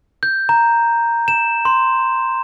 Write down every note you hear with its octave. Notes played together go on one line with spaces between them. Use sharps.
G6
A#5
E7
C6